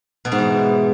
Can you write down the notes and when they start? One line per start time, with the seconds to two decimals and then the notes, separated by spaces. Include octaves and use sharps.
0.25 B2
0.32 G#2
0.38 E3